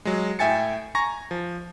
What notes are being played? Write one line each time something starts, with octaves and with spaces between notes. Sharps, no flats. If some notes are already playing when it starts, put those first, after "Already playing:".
F#3 G#3
A2 E5 G5 G#5 A6 C#7
G#5 A#5 C#6 A#6
F3